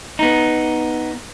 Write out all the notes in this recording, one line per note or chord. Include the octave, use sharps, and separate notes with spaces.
B3 D#4